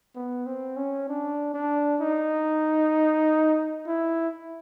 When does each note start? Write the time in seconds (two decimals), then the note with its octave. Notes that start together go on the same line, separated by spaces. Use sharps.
0.15 B3
0.46 C4
0.76 C#4
1.08 D4
1.54 D4
2.01 D#4
3.86 E4